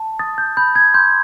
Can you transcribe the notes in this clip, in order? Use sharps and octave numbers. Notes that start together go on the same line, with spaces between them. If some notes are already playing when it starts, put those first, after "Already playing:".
Already playing: A5
D#6 A6
G6
B5 G6
G#6
C6 G6